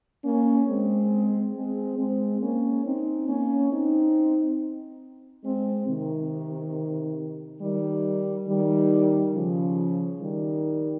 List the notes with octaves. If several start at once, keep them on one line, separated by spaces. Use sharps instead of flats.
A#3 C#4
G#3 C4
G#3 C4
G#3 C4
A#3 C#4
C4 D#4
A#3 C#4
C4 D#4
G#3 C4
C3 D#3
D#3 G3
D#3 G3
C#3 F3
D#3 G3